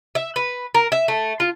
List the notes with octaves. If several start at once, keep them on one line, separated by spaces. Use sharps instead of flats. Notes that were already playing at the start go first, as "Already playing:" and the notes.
E5
B4
A#4
E5
A3
F4